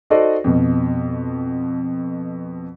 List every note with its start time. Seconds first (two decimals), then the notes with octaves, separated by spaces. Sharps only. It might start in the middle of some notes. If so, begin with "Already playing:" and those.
0.10 D#4 F#4 A4 C5 D5 D#5
0.44 F2 B2